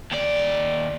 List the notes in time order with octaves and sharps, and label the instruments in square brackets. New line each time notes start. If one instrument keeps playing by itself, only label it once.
[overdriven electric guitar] D#2 D5